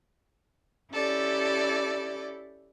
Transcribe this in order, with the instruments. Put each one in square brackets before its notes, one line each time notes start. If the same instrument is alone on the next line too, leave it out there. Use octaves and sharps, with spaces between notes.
[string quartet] C#4 E4 G4 A4 D5